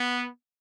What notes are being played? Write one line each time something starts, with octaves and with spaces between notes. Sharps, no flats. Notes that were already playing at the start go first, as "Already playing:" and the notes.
Already playing: B3